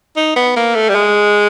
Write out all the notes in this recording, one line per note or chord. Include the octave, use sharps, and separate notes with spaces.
D#4
B3
A#3
A3
G3
G#3